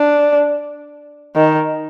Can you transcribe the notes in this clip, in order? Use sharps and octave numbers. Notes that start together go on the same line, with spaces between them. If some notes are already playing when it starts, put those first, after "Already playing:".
Already playing: D4
D#3